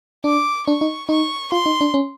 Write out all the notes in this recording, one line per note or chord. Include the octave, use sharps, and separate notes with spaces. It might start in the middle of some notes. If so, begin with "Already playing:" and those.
D4 D6
D4 C#6
D#4
D#4 C#6
F4 C6
D#4
D4
C#4